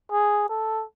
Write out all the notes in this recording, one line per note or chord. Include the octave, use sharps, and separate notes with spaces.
G#4
A4